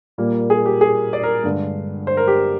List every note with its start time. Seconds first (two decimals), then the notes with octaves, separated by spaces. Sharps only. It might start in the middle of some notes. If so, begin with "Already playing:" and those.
0.18 A#2 G3 A#3
0.50 G#4
0.66 G4
0.81 G#4
1.13 D5
1.23 A#4
1.44 G2 D3 G#3
2.07 C5
2.17 A#4
2.28 G4